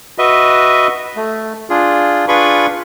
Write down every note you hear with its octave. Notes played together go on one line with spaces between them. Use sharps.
F#4 B4 D#5 E5
A3
D4 F4 G#4
D4 F4 G#4 B4 B5 C#6